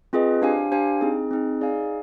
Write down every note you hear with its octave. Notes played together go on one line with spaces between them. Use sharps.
C4 F4 G#4 B4 D#5
D4 G4 C5 F5 G#5
D4 G4 C5 F5 G#5
C4 D#4 G#4
C4 D#4 G#4
D#4 G#4 D5 F5 G#5